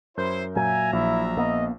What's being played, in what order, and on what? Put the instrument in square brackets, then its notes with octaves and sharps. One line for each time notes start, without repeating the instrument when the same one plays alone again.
[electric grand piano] F#2 A#4 G6 [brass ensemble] E4 C5
[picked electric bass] A#2 F#3 [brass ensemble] E5 A#5 [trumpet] G#5
[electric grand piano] A#1 [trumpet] E4
[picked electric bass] A#3 B3 [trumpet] D#5